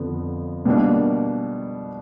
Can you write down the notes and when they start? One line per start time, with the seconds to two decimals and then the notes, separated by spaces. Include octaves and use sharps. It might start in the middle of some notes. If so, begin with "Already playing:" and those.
Already playing: F2 D3 B3
0.65 B2 G3 A#3 D4